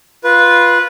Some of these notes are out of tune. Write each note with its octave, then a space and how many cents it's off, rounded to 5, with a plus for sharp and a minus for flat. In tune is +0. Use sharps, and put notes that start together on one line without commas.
F4 +0 B4 -10